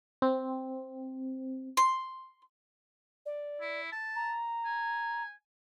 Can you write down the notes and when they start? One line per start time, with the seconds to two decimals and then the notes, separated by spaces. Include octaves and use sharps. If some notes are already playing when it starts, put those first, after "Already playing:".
0.22 C4
1.77 C6
3.26 D5
3.61 E4
3.92 A5
4.15 A#5
4.65 G#5